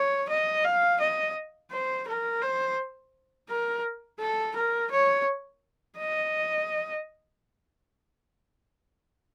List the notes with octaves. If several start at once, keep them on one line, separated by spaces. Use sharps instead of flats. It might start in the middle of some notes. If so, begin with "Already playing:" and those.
Already playing: C#5
D#5
F5
D#5
C5
A#4
C5
A#4
A4
A#4
C#5
D#5